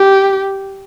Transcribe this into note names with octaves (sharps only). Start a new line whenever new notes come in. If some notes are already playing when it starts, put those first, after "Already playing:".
Already playing: G4